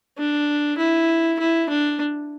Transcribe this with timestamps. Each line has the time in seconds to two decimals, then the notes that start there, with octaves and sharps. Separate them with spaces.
0.18 D4
0.78 E4
1.39 E4
1.69 D4